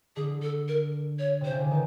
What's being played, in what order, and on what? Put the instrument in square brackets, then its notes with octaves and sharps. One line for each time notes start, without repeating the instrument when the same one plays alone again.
[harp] D3 [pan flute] G#4
[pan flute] A4
A#4
C#5
[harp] C3 [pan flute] C5
[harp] C#3
D3
[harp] D#3 [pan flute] B4